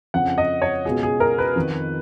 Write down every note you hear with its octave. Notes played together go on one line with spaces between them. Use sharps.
F2 C#3 F#5
D#5
C#5
C#2 B2 G#4
G#4
A#4
B4
F2 D#3